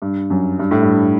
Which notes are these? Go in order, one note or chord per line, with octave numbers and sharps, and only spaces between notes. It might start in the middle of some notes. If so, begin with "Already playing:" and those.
G2
F#2
G2
A2
G2